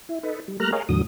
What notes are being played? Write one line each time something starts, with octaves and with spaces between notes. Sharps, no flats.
E4
D#4 A4 B4
G3
G3 A3 A#3 A#5 F6 F#6
G#4 A#4 C#5 D#5 F5
E2 A2 D3 F#3 D#6